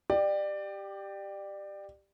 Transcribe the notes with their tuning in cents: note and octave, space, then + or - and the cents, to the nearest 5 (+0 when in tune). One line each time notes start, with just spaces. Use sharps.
G4 +0 D5 +25